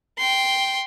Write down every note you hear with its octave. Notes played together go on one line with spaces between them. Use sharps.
G5 C6